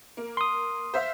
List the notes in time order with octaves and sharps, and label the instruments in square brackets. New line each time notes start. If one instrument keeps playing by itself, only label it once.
[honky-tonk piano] A#3
[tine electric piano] C6 D#6
[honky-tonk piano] C5 E5 F5